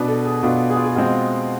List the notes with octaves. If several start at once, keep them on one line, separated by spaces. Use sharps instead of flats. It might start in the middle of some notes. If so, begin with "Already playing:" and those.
Already playing: B2 B3 D4 B4
A4
G#4
B2 B3 D4 F4
G#4
F4
G#4
B2 G#3 C4 F4